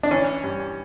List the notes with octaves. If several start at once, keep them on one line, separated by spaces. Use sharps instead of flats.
D4
E3 C#4
G2